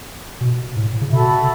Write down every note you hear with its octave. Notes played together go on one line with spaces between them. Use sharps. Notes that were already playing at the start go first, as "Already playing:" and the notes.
B2
A2
C#3
B2 F#4 A4 E5 B5